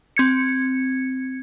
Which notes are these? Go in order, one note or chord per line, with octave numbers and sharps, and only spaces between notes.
C4 G#6 C#7